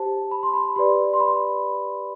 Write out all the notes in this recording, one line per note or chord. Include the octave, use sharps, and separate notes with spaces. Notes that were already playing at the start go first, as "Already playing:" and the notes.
Already playing: G4 C5 A5
B5
C6
B5
G4 B4 D5 C6
C6
B5